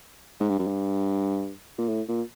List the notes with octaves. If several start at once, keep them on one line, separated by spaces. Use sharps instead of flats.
G#2
G2
F#2
G2
A#2
A2
A#2